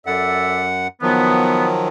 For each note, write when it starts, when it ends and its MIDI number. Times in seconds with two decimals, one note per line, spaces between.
0.06 0.87 42
0.06 0.67 69
0.06 0.67 74
0.06 0.67 76
0.06 0.87 78
1.02 1.88 51
1.02 1.88 53
1.02 1.88 54
1.02 1.67 59